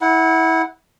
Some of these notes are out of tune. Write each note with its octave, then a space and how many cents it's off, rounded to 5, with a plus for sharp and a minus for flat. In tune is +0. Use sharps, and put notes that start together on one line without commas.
E4 -20 F#5 +0